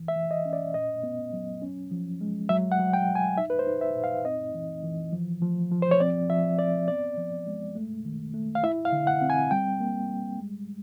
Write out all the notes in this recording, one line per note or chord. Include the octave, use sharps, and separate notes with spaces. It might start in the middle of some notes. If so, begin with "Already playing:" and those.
Already playing: E3
E5
E3
D#5
C#4
D5
A#2 D#5
B3
F#3
C#4
F3
G#3
F#3 E5
F#5
F#3
G5
F#3
G#5
D#4 E5
B4
C5
D#4
E5
A#2
F5
C4 D#5
E3
E3
F3
F3
F3
C5
C#5
C4 D5
F3 E5
C4 D5
B3 D5
F3
G#3
A3
D#3
A3
F5
E4 E5
F5
D3
F#5
C4
G#5
G3 G5
A#3
G3
G#3